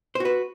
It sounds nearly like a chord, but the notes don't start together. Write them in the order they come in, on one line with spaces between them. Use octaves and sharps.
C5 F#4 B4